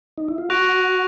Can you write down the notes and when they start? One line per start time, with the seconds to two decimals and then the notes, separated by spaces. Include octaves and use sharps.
0.18 D#4
0.28 E4
0.38 F4
0.50 F#4 C#6 F#6 A#6 D7 F7